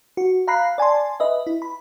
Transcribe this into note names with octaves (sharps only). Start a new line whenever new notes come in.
F#4
F5 A#5 B5 F#6 B6 C7
D5 G#5 A5 C6
B4 D#5 E5
E4
B5